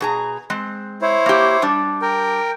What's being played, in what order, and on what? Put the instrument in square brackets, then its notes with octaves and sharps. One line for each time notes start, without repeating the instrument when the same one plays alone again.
[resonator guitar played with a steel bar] B2 G#4 A#5
G#3 C4
[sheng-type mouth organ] E4 C5 C#5
[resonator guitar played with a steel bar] A#3 G4
G3 D4
[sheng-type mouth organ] A#4 G5